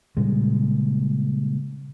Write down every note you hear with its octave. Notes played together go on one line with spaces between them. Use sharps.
A#2 C#3 G3 G#3